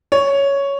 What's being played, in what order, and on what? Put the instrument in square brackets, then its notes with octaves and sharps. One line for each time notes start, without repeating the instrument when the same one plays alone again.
[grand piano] C#5